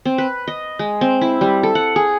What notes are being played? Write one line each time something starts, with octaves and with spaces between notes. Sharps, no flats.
C4
B4
D#5
G#3
C4
E4
G3
A4
F#5
G#4